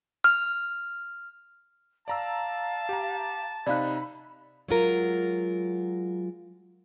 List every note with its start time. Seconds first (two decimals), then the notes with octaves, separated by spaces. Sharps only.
0.24 F6
2.08 D5 F5 A5 A#5 E6
2.89 G4 A#5
3.67 C3 D#4 D5 F5 B5 F#6
4.68 F#3 G#3 F4 A#4